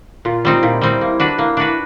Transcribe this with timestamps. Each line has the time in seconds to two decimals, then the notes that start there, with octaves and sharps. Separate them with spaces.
0.25 A#2 F4
0.45 G3 C4 D#4
0.62 A#2 E4
0.81 G3 C4 D#4 E4
1.01 A#3
1.20 D4 F#4 B4
1.38 A#3
1.57 D4 F#4 B4